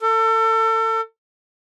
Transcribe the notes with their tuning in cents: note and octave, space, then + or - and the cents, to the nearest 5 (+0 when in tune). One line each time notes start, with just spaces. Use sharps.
A4 +30